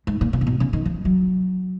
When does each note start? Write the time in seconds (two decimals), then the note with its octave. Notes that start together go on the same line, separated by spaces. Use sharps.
0.07 G#2
0.21 A#2
0.33 B2
0.41 C#3
0.47 B2
0.60 C#3
0.73 D#3
0.85 F3
1.05 F#3